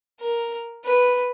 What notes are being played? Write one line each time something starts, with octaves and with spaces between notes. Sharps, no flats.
A#4
B4